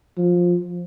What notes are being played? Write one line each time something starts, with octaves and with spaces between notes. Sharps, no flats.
F3